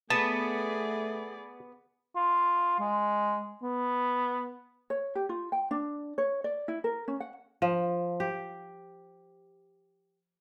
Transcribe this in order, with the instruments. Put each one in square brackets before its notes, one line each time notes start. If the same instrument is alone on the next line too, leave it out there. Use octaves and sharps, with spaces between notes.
[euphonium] A3 [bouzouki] B3 [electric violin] G#4 D5 [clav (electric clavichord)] A5
[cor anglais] F4
G#3
B3
[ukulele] C#5
G4
F4
G5
D4
C#5
D5
E4
A#4
C#4
F#5
[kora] F3
G4